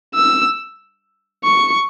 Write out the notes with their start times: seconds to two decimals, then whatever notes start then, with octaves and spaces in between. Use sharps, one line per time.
0.15 E6
1.44 C#6